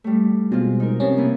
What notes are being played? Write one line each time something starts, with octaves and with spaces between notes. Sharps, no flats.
G3 A3
B2 G#3 C4 F4
D#4 A#4
C3 F3 C#4
A#3 B3 E4